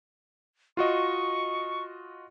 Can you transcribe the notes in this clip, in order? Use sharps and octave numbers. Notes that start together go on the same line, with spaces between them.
F4 F#4 D#5 C#6